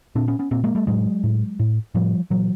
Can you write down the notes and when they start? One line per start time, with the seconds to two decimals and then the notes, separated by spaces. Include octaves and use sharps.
0.15 A#2 C4 D4
0.28 B3 C#4
0.39 B3 C#4
0.51 A#2 A#3 C4
0.64 G#3 A#3
0.75 G3 A3
0.87 A2 F#3 G#3
1.24 A2
1.59 A2
1.95 A2 F3 G3
2.30 A#2 E3 F#3